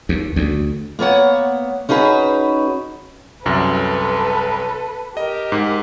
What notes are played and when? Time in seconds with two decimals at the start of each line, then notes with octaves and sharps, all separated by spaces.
0.09 D#2
0.36 D2
0.99 A#3 B3 C#5 F#5
1.89 C#4 D#4 F#4 G#4 B4
3.45 C2 F#2 A4 B4
5.17 G4 A#4 D#5
5.52 G#2